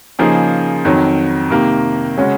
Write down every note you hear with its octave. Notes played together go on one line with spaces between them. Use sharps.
C#3 F3 A#3 D#4 G#4
F2 D#3 F#3
C3 D#3 A#3
C#3 G#3 C#4 F#4